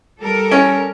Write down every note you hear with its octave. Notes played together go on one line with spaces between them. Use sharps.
G3 A4 A#4
C#4